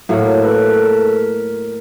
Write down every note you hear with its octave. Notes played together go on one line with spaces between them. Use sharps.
A2 F#3 A#3 A4
A#4
A4 B4
A#4
A4
A#4
A#4